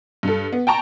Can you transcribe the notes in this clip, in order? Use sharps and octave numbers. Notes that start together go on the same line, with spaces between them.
G2 A4
B3
G5 A5 A#5 C#6